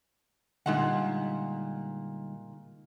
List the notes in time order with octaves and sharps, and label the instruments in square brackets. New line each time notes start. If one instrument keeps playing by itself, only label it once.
[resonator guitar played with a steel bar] A#2 G#3 F#5 [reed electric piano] D3 G3 D#4